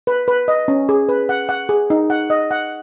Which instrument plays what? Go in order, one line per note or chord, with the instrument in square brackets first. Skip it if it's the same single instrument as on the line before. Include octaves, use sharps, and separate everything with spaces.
[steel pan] B4
B4
D#5
C#4
G#4
B4
F#5
F#5
G#4
D#4
F#5
D#5
F#5